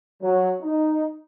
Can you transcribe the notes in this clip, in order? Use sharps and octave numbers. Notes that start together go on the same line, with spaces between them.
F#3
D#4